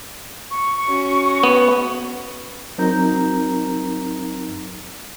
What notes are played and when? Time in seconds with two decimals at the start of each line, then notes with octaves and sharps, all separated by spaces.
0.51 C#6
0.87 C#4 F#4
1.43 B3
2.78 F#3 C4 D#4 A#4 A#5 G6